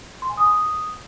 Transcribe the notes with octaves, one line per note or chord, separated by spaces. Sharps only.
C6
G#5
D#6